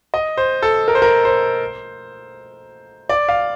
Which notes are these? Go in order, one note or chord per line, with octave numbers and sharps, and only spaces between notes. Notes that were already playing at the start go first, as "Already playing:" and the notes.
D#5
C5
A4
A#4
C5
A#4
C5
D5
F5